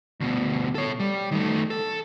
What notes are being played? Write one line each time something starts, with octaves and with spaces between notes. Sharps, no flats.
D2 B2
A4 C#5
G3
D#3 A3
A4